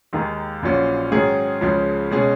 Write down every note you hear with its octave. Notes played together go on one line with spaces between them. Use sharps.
D#2 D#3 G#3 D#4 G#4
A#1 A#2 F#3 C#4 F4
G#2 D#3 F#3 C#4 G#4
C#2 C#3 F3 G#3 C#4
B2 G#3 C#4 G#4